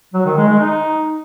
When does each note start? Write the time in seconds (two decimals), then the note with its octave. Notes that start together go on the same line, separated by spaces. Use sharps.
0.14 F#3
0.25 D#3
0.37 G#3
0.48 G#3
0.60 D#4